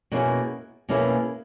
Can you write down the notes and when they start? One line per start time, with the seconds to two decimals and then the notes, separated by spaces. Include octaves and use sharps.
0.12 B2 A#3 C#4 E4 G#4
0.89 B2 A#3 C#4 E4 G#4